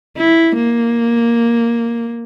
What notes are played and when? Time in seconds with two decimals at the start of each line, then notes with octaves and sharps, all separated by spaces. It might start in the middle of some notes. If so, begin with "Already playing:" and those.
0.18 E4
0.56 A#3